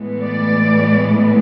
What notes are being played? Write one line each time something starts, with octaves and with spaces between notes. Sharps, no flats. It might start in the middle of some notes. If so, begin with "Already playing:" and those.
Already playing: A2 E3 G#3 B3
D5